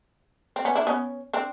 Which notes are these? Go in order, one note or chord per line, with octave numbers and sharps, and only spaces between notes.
C4
B3 C#4
D4 E4
B3 C#4
C4 D4